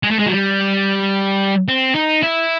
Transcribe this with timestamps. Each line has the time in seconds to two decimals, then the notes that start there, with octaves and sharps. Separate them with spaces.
0.03 G#3
0.11 A3
0.19 G#3
0.27 F#3
0.30 G3
1.68 C4
1.95 D#4
2.23 E4